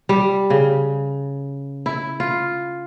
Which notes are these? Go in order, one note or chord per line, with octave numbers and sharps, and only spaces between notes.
G3
C#3
E4
F4